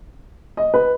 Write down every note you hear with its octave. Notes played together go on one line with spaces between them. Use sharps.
D#5
B4